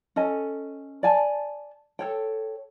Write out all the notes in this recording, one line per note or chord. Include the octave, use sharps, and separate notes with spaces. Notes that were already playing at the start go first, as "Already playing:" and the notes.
C#4 A4 D#5 G#5
D5 G#5 A5
A4 C#5 G5